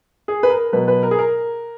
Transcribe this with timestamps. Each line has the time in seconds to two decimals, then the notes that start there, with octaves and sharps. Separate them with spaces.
0.28 G#4
0.43 B4
0.50 A#4
0.73 B2 F#3 B4
0.88 B4
1.03 A#4
1.11 G#4
1.19 A#4